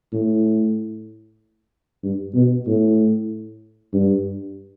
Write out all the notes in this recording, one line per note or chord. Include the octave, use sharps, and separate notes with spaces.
A2
G2
B2
A2
G2